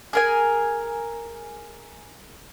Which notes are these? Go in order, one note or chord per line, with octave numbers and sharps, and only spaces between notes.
G#4 A#4 G#5